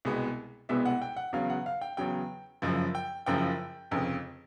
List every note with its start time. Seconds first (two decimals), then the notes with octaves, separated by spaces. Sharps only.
0.05 C2 B2 G#3 B3
0.69 C2 B2 G#3 B3 E5
0.85 F#5
1.02 G5
1.17 F#5
1.33 E2 C#3 F#3 F5
1.50 F#5
1.66 F5
1.81 G5
1.97 E2 C#3 F#3 G5
2.62 F#1 F#2 C#3 F3
2.95 G5
3.26 F#1 F#2 C#3 F3 G5
3.91 F1 F2 C#3